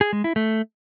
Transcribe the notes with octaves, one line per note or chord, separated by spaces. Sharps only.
G#4
G#3
E4
A3